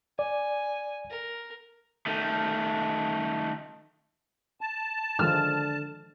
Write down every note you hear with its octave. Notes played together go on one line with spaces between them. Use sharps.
D5 G#5
A#4
D#3 A3
A5
D3 D#3 F3 G#3 F6